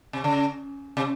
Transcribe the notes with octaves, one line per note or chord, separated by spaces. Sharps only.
C3
C#3
C3